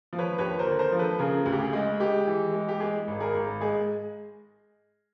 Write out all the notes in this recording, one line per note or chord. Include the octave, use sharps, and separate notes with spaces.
F3
B4 C#5
D#2 B4 C#5
A#4 C5
D3
A#4 C5
F3
A4 B4
C#3 G#4 A#4
D2
G4
G#4
G#3
G#3 G4
E3
G#3
G4
G#3 G#4
G#1
G#4 A#4
G#1
G#3 G#4